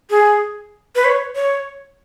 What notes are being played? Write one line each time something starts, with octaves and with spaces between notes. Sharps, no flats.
G#4
B4
C#5
C#5